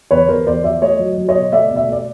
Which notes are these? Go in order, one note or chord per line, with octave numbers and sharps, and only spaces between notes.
E2 B4 C#5
E2 A#4 C5
E2 C5 D5
F3 D5 E5
A3 C#5 D#5
F#3
F#3
C#5 D#5
B2
A3 D5 E5
B2
D5 E5
A3 D5